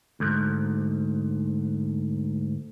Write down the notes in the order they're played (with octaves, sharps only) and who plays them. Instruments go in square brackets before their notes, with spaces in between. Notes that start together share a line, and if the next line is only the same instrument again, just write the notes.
[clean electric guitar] D2 G#2